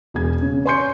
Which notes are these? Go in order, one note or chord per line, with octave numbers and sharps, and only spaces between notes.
E1 G#4 G#6
C#3
C#5 G#5 C6 C#6 G6 C#7